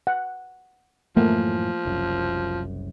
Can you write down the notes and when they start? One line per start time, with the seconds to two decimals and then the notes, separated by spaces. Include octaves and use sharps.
0.07 F#5
1.16 F#2 A2 E3 F3 A3 A#3
1.85 F#1 C2 F#2